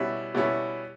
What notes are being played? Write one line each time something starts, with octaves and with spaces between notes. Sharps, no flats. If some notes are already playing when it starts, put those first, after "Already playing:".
Already playing: B2 G3 C#4 E4
B2 G3 C#4 E4